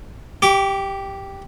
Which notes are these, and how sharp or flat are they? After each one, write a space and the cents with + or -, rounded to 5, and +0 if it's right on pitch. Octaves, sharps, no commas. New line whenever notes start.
G4 +0 D6 -35